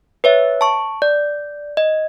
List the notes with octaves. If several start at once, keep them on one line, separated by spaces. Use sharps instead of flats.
B4 C#5 E5
A5 C#6
D5
D#5